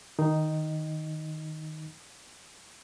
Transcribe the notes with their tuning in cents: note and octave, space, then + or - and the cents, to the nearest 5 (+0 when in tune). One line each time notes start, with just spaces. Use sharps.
D#3 +0 D#4 +0